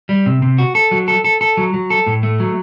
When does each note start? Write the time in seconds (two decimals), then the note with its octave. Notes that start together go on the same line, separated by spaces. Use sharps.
0.09 G3
0.26 C3
0.42 C3
0.58 F#4
0.75 A4
0.91 F#3
1.08 A4
1.24 A4
1.41 A4
1.57 F#3
1.74 F#3
1.90 A4
2.06 A2
2.23 A3
2.40 F#3